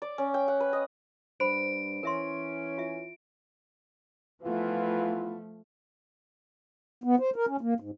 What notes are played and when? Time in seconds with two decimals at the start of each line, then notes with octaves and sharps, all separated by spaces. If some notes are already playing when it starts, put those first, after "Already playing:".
0.02 D5
0.18 C#4
0.34 G5
0.48 F#5
0.60 B4
0.73 D#5
1.40 G2 C5 B5 D7
2.03 E3 C#4 A#4 E5 C6
2.78 F4 E5
4.42 E3 F3 A3 B3 F4
7.04 B3
7.20 C5
7.36 A#4
7.48 C#4
7.61 A#3
7.80 G#2